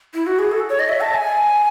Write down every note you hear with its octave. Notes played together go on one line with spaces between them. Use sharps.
E4
F#4
G#4
A4
C#5
D#5
E5
A5
G#5